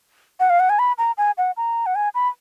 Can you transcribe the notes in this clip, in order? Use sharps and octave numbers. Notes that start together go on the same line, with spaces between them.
F#5
F5
F#5
G#5
B5
A#5
G#5
F#5
A#5
F#5
G#5
B5